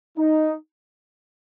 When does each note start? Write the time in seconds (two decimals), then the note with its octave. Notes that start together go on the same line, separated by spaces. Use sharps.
0.18 D#4